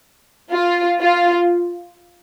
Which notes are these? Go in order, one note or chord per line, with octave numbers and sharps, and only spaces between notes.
F4
F4